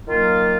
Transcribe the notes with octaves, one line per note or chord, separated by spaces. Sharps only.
D#3 F#3 A#3 F4